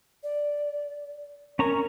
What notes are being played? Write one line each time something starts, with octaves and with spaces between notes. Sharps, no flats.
D5
C#4 A#4 A#5 C#6